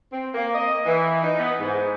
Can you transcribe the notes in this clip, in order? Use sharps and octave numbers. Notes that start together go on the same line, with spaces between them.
C4
A#3
D#5
E3
D#4
B3
G#2